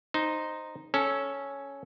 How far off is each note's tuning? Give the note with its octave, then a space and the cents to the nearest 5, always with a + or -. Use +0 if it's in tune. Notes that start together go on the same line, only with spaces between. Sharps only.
D#4 -5 C5 +0
C#4 +0 A4 -10